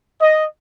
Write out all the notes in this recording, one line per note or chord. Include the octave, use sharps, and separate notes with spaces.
D#5